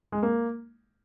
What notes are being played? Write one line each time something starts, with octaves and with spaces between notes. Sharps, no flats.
G#3
A#3